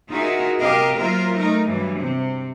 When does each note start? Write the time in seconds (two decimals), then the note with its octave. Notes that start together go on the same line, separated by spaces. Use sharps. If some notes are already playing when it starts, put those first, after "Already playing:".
0.10 D#4 F4 F#4 G#4 A#4 E5
0.60 C3 G4 A#4 D#5 F5
0.99 F#3 A#3 F4 A#4 C5 E5
1.36 A3 D#4 A#4
1.67 G2 E3 F#3 G3
1.99 C3 C4